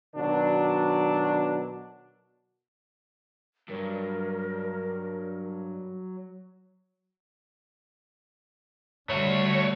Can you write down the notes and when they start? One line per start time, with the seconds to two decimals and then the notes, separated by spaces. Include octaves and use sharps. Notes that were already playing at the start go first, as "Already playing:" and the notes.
0.14 B2 D#3 F#3 D4
3.69 G2 F#3 A#4
9.10 D3 G3 A3 F#4 C#5